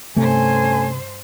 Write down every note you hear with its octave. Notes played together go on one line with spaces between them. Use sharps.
G2 C3 A3 C#4 A4 C5 G#5